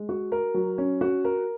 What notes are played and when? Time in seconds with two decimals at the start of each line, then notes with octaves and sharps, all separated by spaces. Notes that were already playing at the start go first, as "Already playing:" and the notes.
Already playing: G#3
0.09 F#4
0.32 A#4
0.54 F#3
0.78 C#4
1.01 F#4
1.25 A#4